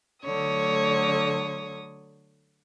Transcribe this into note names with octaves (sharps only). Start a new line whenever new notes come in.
D3 F#3 A3 C#5 D#6